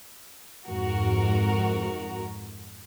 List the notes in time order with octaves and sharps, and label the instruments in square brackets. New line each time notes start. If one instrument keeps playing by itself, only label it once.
[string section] F2 G#2 F#4 A#4